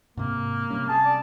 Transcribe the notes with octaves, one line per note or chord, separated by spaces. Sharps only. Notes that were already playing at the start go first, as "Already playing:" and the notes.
G#2 C3 A#3
C3 G3 C#4
G#4 A5
D5